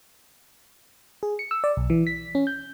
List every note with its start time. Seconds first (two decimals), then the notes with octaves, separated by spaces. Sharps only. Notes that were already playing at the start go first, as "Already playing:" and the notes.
1.23 G#4
1.39 C#7
1.51 E6
1.64 D5
1.77 B1
1.90 E3
2.07 B6
2.35 C#4
2.47 G6